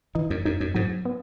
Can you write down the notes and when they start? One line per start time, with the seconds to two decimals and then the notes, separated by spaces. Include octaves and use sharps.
0.15 E3 D#4
0.30 F#2
0.45 F#2 D#4
0.60 F#2
0.74 G#2 F#3
1.05 B3